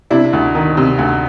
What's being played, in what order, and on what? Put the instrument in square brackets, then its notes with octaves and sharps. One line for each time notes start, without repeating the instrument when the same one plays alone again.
[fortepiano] C3 D4 E4
D2
D#3
C3
D2